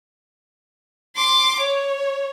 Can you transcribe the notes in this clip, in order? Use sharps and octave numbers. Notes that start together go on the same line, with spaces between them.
C6 D6
C#5